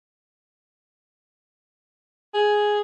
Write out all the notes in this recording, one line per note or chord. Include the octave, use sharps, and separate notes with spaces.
G#4